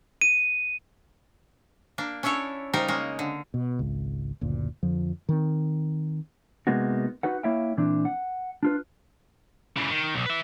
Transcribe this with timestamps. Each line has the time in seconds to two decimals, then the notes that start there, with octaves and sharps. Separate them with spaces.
0.21 D#7
1.98 A#3 D4
2.23 C#4 D4 E4 A4 C#5
2.73 C#3 G3 D#4 A#4 C5
2.88 G#3 A#3 C#4 A#4
3.19 D3
3.54 B2
3.79 G#1 C#2
4.41 F#1 D2 A#2
4.83 F2 D3 F3
5.29 D#3 C4
6.67 C3 G#3 A#3 B3 D#4 F#4
7.23 D#4 F#4 B4 F#5
7.43 A#3 E4 C#5 E5 F5 G5
7.77 A#2 E3 C4 D4
8.05 F#5
8.63 D4 F4 B4
9.77 C#3 E3
9.91 D#3
10.14 B1
10.26 B4 E5